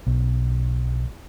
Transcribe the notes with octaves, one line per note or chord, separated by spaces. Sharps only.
B1